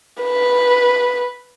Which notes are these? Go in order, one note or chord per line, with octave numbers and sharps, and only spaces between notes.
B4